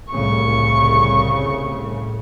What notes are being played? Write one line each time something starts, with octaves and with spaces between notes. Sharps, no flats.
C2 A2 C#3 C#6